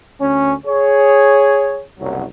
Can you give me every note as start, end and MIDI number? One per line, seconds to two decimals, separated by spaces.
0.20 0.53 38
0.20 0.53 61
0.66 1.81 68
0.66 1.81 73
1.99 2.24 30
1.99 2.24 36
1.99 2.24 54